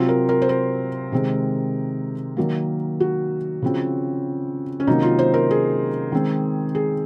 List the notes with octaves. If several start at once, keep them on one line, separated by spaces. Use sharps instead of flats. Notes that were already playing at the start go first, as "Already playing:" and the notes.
Already playing: C3 F#3 C4 F4
A#4
A#4
C5
A#4
C3 D#3 G#3 C4
D#3 F#3 A#3
F#4
C#3 F3 C4
C#4
C3 D#3 F#3 A#3 D#4
F4
C5
A#4
G#4
D#3 G#3 C4
G#4